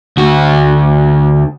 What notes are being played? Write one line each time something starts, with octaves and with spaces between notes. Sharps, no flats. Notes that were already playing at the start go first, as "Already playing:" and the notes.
D2 F#4